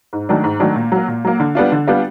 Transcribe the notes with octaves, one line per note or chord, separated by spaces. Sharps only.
G#2
D#3 F#3 A3 D4
G#2
D#3 F#3 A3 D4
A#2
F#3 A#3
A#2
F#3 A#3
D3
G3 B3 D4 F4
D3
G3 B3 D4 F4